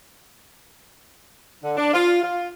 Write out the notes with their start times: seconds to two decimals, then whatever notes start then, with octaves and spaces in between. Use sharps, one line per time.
1.64 D3
1.77 D4
1.93 F4
2.22 F4